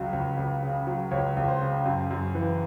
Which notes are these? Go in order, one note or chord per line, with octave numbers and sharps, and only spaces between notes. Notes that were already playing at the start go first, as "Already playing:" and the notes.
Already playing: C#2 C#3 F#3
C#2
C#2
C#3
F#3
C#2 C#5
C#2
C5
C#3
F#2
F#2
E3